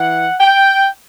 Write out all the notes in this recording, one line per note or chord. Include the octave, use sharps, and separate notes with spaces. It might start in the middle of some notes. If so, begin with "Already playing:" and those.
Already playing: E3 F#5
G5